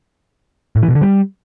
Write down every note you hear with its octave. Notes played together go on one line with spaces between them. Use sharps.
A2
E3
B2
D3
G3